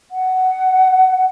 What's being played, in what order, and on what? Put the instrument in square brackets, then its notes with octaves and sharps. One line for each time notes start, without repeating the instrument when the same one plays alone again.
[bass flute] F#5